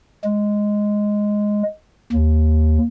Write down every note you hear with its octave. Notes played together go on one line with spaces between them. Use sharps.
G#3
D#2